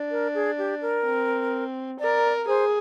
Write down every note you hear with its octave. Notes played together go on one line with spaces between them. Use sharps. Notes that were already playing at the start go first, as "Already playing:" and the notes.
Already playing: D4
A#4
G#4
G4
A#4
C4
A#4 D5
G#4 C5